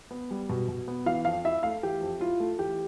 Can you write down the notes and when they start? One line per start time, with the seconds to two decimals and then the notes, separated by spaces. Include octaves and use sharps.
0.11 B3
0.31 G3
0.49 B2
0.68 B2
0.88 B3
1.06 E3 F5
1.25 F2 F5
1.45 E4 E5
1.63 A3 F5
1.83 E3 G4
2.01 F2
2.20 E4 F4
2.40 A3
2.58 E3 G4